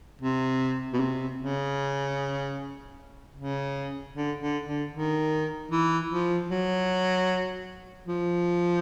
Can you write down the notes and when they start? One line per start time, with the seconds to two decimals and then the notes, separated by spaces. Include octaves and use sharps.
0.22 C3
0.93 B2
1.00 C3
1.39 C#3
3.36 C#3
4.14 D3
4.40 D3
4.67 D3
4.93 D#3
5.71 E3
6.10 F3
6.50 F#3
8.07 F3